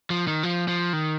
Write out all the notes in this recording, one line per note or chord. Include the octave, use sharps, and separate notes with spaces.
F3
D#3
F3
F3
D#3